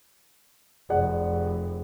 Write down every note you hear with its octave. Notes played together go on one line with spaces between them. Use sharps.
F1 G#4 D5 F#5